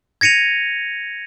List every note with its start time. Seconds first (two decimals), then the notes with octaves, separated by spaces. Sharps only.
0.21 G#6 A#6 C#7 D#7 F7